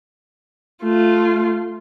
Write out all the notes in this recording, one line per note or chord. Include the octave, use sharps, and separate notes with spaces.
A3 F4